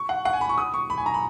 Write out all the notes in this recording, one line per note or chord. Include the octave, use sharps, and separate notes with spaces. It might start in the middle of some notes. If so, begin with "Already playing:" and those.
Already playing: C#6
F#5
F#5
G#5
B5
C#6
D#6
C#6
B5
G#5
A#5
B5